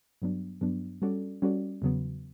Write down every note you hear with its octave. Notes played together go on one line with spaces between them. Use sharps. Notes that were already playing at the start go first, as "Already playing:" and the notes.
G2 F#3 B3 D4
G2 F#3 B3 D4
G3 C#4 F#4 A4 D5
G3 C#4 F#4 A4 D5
E2 C#3 F#3 B3